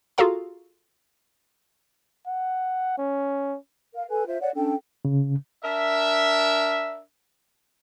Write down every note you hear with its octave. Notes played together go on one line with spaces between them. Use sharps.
F4 F#4 G#4 A4 F5 A#5
F#5
C#4
A#4 F5
A4 B4 G#5
F4 C5 E5
C#5 D5 F#5
C#4 D4 A4 G5
C#3
D4 A#4 E5